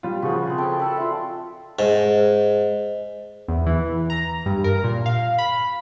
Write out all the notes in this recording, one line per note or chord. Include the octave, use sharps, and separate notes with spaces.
G3 F4
C#3 F3 F#4 B4
C4 G#4
A4 G5 A5
A4 B4 D5
F4 E5
G#2
E2
E3
A#5
G2
A#4
A#2
F5
B5